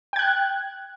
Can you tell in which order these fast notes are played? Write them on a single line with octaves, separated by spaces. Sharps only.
G5 G#6 F#6